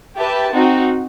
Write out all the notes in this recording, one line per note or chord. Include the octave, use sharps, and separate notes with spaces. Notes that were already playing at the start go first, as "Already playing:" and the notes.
G4 B4 E5 A5
C4 D#4 F#4